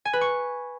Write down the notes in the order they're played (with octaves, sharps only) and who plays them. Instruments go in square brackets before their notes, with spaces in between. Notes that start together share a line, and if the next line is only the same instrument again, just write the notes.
[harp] G#5
B4
C#6